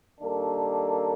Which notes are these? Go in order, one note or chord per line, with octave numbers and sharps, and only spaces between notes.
G2 D#3 A#3 D4 A4